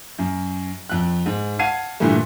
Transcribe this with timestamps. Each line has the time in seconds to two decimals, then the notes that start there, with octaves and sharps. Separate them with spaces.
0.19 F#2
0.89 F2 F#6
1.26 G#2
1.59 F5 F#5 A5 G#6 C7 D#7
2.00 G2 A#2 D3 E3 G3 A3